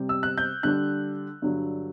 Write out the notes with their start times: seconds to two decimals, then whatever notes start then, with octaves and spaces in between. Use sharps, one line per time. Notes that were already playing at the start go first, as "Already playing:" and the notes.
Already playing: C3 G3 C4
0.09 E6
0.23 F#6
0.38 G6
0.63 D3 G3 D4 F#6
1.42 G2 D3 F#3